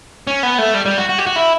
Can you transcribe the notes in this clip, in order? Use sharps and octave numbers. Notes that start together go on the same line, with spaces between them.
C#4
B3
A3
G3
G3
F#4
F#4
G4
F#4
E4